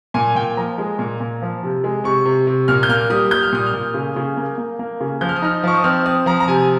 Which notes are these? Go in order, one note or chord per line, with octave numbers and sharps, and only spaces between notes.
A#2 G#5
A#2 G5
F3 A#5
G#3
A#2
A#2
F3
C3
G#3
C3 C#6
C3
C3
A#2 F6
G6
A#3 F6
G3 D#6
G3 G6
F6
A#2 D#6
F6
A#2
C#3
C#3
A#3
A#3
A#3
C#3
F3 G6
F6
D#6
D#4 F6
F3 C#6
D#6
C4 F6
C4 D#6
F3 A#5
A#5
C3 G#5